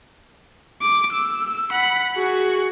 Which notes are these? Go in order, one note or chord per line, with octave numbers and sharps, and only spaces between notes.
D6
E6
F#5 B5
F#4 G#4